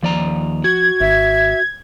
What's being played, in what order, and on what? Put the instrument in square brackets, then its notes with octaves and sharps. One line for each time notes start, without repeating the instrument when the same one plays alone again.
[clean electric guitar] D#2 D5 A#5 [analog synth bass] F3
[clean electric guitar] F#4 [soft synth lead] G#6
[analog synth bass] G#1 [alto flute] E5